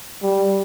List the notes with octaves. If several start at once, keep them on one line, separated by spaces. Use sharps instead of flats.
G3